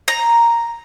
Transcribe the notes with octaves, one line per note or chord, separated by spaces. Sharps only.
A#5